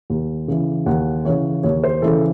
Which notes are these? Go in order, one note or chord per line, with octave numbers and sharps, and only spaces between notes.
D#2
C#3 E3
D#2 F#5
C#3 E3 C#5
D#2 C#5
C5
C#3 E3 A4